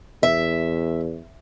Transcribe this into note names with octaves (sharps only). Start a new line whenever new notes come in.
E2 E5